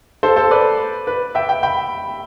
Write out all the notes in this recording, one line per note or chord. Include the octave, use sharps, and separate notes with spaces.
A4 C5
A4 C5
B4 D5
B4
E5 G5
E5 G5
G5 B5